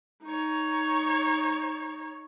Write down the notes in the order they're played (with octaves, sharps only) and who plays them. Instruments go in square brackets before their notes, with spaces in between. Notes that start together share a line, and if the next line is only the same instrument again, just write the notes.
[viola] D#4 C#5